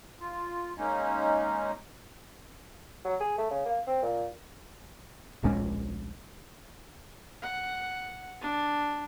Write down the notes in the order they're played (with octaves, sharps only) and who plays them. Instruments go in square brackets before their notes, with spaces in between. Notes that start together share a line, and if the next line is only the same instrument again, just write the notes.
[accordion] F4
G#3 A#3 C#4 D#4
[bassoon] F#3
G#4
A3
C#3
A#3
C4
A#2
[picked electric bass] D1 A#1 G#3 C#4
[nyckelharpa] F#5
D4